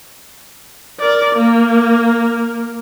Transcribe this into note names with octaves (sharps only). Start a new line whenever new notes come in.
A#4 D5
A#3